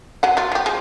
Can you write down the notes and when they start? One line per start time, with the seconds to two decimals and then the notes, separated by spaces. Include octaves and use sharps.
0.23 F#3 F#5
0.37 F#3 F4
0.52 F#3 G4
0.66 F3 G#3